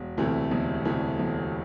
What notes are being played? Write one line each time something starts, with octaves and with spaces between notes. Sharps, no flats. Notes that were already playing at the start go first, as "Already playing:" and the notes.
Already playing: E1
D2 C3 E3 A3
E1
D2 C3 E3 A3
E1